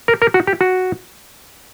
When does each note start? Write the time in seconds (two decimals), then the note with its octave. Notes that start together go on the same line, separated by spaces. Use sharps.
0.08 A#4
0.22 A#4
0.34 F#4
0.47 G4
0.61 F#4